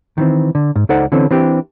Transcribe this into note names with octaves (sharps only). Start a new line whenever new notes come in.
D#3 E3 C4
D3
G#2
C#2 D#4 A4 C5 D5 F#5
D3 E3 C4 C#4 A4
E3 C4 D4 G4